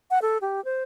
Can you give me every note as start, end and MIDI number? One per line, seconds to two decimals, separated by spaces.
0.11 0.19 78
0.22 0.38 69
0.41 0.63 67
0.65 0.83 72